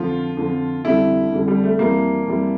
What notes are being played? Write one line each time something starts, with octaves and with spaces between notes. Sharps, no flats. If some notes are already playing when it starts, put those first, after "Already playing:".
Already playing: F2 D3 F3 F4
F2 D3 F3
F2 D3 G3 E4
F2 D3 G3
G3
A3
F2 E3 G3 A#3
F2 E3 G3